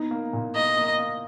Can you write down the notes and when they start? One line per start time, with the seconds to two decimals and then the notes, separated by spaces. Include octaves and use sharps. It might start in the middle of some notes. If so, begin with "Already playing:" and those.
Already playing: B3 D#4
0.11 A#3
0.33 A#2
0.55 A#3 D#5
0.77 A#3
0.99 A#3